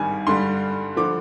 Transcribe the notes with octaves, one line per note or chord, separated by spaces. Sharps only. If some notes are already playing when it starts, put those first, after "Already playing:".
Already playing: G#1 G2 D#3 G3 G#5
G2 D3 G3 C6
D3 F3 D6